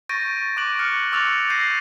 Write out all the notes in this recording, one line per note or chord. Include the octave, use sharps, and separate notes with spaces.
C#6 G6 A6 A#6 D7 D#7
C#6 D6 F#6 D7 F#7
F6 F#6 C#7
C#6 D6 E6 F#6 A6 F7
G6 A#6 C7 D#7